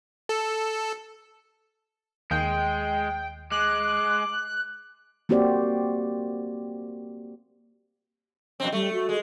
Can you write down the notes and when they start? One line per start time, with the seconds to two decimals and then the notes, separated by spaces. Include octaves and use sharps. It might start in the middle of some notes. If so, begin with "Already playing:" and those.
0.29 A4
2.31 D#2 G#3 G5
3.51 G#3 D6 F#6
5.29 A#3 C4 F#4 G4 C5 D5
8.60 F2 B2 C4
8.73 G3 A3
8.93 F#4
9.09 G#3